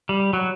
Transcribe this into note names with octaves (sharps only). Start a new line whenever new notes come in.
G3
F#3